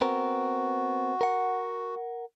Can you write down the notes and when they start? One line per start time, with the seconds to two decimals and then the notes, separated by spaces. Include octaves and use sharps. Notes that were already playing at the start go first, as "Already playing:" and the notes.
0.01 B3 C4 F#4 A#4
1.21 A#4 F#5